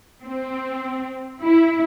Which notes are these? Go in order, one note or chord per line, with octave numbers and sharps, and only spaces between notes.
C4
E4